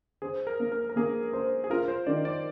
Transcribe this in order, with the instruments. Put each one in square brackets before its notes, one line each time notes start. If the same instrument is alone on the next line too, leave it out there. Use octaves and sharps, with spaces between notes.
[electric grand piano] G#4 [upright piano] C5
[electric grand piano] A#4
[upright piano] A#3
[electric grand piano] A#4
A#4
[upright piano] A#3 [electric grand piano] G#4
[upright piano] C5
[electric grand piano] G#4
[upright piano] F4 [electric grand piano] A#4
[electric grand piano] C5
[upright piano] D#3 [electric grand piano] D5
[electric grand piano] D5